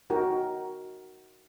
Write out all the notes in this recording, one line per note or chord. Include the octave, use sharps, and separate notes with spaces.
D#4 F#4 A#4 G5